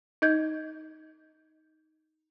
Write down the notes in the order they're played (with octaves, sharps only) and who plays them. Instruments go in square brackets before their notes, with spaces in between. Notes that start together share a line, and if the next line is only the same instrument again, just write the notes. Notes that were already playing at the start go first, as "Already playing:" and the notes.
[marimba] D#4 D#5 G6 G#6